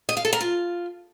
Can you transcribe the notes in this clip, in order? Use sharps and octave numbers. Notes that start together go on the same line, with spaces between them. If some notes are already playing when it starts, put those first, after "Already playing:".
D#5
F5
A4
A#4
F4